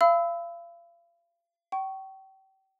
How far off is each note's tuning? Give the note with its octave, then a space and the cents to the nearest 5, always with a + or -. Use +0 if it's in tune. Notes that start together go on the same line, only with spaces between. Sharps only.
F5 -40 B5 +25 E6 -15
G5 -35 C#6 +0